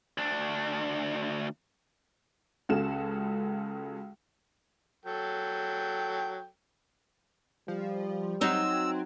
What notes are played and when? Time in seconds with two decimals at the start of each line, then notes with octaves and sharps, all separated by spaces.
0.18 D2 D4
2.69 C#2 C#3 F#4 A4 E7
5.05 F#3 A4 G5
7.68 F3 G3
8.41 F#3 C4 D#4 E6